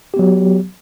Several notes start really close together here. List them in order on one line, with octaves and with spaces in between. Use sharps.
G4 B3 F#3